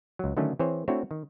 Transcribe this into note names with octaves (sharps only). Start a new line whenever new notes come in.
C#2 F#3
D3 D#3 F#3 A3 C#4
E3 C4 G#4 C5 C#5
A3 C4 D4 E4 F#4 C#5
D#3